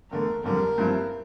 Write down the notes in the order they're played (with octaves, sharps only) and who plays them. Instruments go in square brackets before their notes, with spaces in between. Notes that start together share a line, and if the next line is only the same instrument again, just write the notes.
[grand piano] E2 D3 A3 [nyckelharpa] A#4
[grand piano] F2 D3 G3 [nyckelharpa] A#4
[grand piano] G2 F3 C4 E4